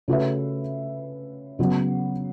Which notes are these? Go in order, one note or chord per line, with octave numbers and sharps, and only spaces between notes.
C#3 A3 F#4 B4 E5
C#3 F#3 B3